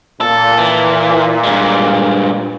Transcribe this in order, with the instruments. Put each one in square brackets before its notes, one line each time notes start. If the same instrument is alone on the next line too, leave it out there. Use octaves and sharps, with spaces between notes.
[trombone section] A#2 [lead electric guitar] A4
[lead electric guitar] E3
G2 G#3